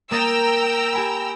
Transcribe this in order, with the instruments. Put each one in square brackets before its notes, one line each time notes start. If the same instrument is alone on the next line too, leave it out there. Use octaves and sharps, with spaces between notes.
[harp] A#3 D#6 A6 [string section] G5 A#5 E6
[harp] G4 G#5 B5